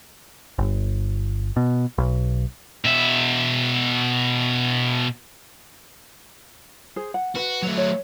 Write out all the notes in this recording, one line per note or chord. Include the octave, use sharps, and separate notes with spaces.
G1
B2
B1
B2 E5
G#4 C5
F#5
F#4 B4
F#3 A3
C#5